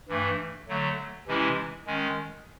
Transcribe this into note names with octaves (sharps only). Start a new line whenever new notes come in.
G2 E3 A3
D3 F#3 A3
C3 E3 G#3 C#4 E4
D#3 G#3 C#4